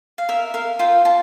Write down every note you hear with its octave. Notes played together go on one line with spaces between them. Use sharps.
F5
A#4 E5
A#4 F5
F4 G5
F4 A5